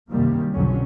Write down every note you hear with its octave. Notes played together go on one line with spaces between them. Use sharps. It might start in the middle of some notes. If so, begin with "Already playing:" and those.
C2 F#2 C3 D#3 G3 A#3
B1 F2 D3 F#3 C#4